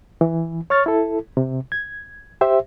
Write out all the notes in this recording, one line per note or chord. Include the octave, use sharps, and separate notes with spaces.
E3
C#5 C#6 F6 A6
E4 A4
C3
G#6
G4 C5 E5